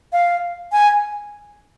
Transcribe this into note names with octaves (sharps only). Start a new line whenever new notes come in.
F5
G#5